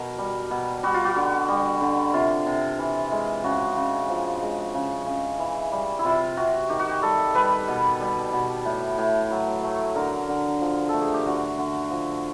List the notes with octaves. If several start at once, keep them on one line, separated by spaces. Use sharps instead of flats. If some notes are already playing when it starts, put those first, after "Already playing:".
Already playing: B2 A#4
G3
B2
G3 F#4
F4
F#4
D3
G3
D3
C3 F4
C3
E3
G#3
C#3 F#4
C#3
F3
G#3
C#3
C#3
E3
G3
E4
C3 F4
C3 F#4
D#3 G4
F#4
G4
G3 A4
G3 B4
B2
G3
B2
A2
A2
F#3
A3
D3 A#4
D3
F3
A3 A4
G#4
G4
D3 F#4
D3
F3